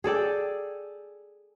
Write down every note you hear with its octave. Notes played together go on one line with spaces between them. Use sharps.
G#4 A4 D5 G5